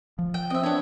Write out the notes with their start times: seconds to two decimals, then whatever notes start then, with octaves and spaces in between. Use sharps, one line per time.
0.19 F3
0.34 G5
0.50 C4 D#5 E5
0.63 B3 D4 C#5